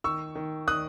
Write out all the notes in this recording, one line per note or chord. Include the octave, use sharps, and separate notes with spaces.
D#3 C#6 E6
D#3
D#3 D#6 F#6